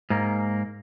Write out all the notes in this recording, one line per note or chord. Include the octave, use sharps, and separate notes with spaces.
G#2 A#3